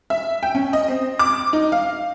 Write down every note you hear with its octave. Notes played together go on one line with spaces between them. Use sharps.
E5
G5
C#4
D#5
C4
D6
D#4
F5